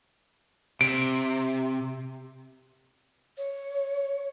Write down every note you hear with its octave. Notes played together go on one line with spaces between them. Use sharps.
C3 D7
C#5